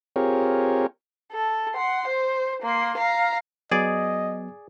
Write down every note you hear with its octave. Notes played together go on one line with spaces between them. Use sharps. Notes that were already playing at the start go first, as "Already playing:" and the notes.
C4 F4 G4 G#4 A#4 C#5
A4
F#5 C6
C5
A#3 C6
F5 A#5
F#3 B3 G#4 D5 D#5